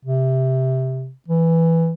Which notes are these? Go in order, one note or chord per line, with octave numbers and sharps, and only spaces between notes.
C3
E3